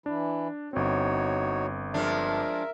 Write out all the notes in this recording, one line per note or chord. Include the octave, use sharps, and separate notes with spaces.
E3 D4 E4
G1 C4 D#4 F#4 C#5
F3 G#3 D4 A#4 E5